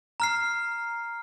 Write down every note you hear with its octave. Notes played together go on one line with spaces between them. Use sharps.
A#5 F6 C7